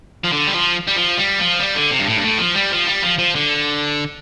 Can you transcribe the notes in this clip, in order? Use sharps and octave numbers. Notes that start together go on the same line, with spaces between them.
F3
D3
G3
F3
G3
F3
G3
F3
G3
D3
C3
G2
A2
G2
A2
F3
G3
F3
G3
F3
F3
D3